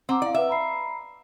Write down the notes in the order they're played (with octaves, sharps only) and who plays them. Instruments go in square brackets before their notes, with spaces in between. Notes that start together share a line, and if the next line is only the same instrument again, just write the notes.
[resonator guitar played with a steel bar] C4 [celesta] F#5 A#5 D6
[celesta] E4 F5 [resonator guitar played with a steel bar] D5
[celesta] B4 F#5 E6 [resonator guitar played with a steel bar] E5
[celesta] A#5 B5 C7